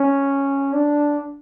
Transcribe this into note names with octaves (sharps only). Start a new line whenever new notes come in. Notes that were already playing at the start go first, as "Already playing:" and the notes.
Already playing: C#4
D4